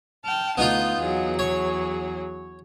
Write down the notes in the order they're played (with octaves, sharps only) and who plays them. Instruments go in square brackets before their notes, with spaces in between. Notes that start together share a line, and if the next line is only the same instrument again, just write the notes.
[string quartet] G5 A5 F6
[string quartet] D2 G6 [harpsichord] B3 D#4 F4
[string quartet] E2 F#3 G#4
[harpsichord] C#5